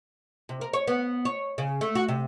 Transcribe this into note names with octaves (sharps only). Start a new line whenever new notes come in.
C3
A#4
C#5
B3
C#5
C#3
A3
F#4
C3